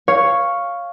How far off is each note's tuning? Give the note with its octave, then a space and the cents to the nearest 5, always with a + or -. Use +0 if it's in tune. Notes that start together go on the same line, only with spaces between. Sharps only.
C#5 +0 F5 +0